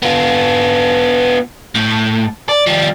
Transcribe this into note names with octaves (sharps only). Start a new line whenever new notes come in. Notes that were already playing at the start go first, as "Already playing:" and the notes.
B3 F4
A2
D5
F3 G3